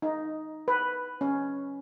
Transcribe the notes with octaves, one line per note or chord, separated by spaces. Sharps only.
D#4
B4
C#4